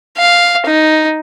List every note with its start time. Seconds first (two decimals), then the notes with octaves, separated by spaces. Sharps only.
0.18 F5
0.67 D#4